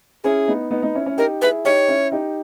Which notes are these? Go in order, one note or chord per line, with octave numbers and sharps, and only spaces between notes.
C#4 E4 G#4
B3 D#4
B3 D#4
B3 D#4
C#4 E4
C#4 E4
D#4 G4 A#4
E4 G#4 B4
D#4 G4 C#5
C#4 E4
D#4 G4